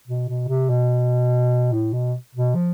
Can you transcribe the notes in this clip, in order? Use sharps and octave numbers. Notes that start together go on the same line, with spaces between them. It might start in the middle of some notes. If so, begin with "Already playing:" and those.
B2
B2
C3
B2
A2
B2
B2
F3